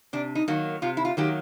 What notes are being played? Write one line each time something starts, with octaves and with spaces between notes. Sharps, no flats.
C3 D4
D#4
D#3 F#3 A#3
C3 F4
E4
F4
D#3 F#3 A#3 G4